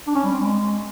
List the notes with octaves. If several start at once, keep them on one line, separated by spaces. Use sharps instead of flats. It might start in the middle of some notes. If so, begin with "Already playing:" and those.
D4
C#4
G3
C4
G#3